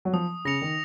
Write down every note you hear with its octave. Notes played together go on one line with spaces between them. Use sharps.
F#3
F3 D#6
C#3 A#6 C#7 F7
D#3